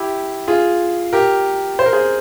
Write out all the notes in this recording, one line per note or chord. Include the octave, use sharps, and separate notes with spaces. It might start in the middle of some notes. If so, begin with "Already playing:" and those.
Already playing: E4 G4
F4 G#4
G4 A#4
C5
A#4
G#4 C5